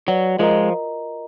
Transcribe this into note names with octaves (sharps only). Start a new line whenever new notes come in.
F#3 F#4 B4 D5 F#5
F3 G#3 F4 A#4 D#5 A#5